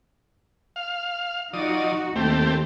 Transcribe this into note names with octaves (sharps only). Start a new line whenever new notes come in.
F5
F3 D#4 F#4 D5 D#6
D#2 D#3 A3 C4 G4